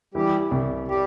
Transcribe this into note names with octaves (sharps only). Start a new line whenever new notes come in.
E3 G3 G4
C2
G3 G4